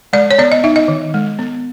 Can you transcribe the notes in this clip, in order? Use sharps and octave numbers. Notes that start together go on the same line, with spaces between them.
G#3 D5
C#5
B3 D5
D#5
D#4 E5
D#5
D#3
G#3
B3